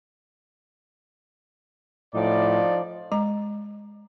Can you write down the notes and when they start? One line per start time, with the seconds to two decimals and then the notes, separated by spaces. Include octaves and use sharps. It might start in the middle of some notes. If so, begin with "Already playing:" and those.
2.15 A2 F3 D#4 D5
3.12 G#3 A#5